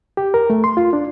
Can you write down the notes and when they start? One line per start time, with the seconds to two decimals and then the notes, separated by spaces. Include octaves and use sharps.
0.17 G4
0.34 A#4
0.50 A3
0.64 C6
0.77 F4
0.93 D4